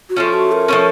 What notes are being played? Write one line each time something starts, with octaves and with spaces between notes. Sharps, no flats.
F#4
F3 A3 C#4 F4
F#4
A#4
F3 A3 C#4